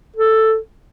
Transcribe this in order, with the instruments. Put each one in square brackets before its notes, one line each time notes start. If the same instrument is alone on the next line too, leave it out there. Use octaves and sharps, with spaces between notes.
[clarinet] A4